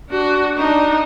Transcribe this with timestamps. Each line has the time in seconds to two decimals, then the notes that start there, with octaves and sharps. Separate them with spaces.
0.10 D4 F#4
0.57 D4 D#4